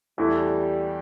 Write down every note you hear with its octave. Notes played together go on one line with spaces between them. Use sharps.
E2 E3 G3 A3 E4 A4